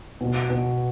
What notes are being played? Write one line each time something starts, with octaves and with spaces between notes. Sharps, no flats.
B2
B2